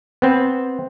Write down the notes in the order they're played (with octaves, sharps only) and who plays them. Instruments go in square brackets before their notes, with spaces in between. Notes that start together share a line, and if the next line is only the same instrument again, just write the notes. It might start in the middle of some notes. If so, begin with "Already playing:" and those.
[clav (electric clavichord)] B3 C4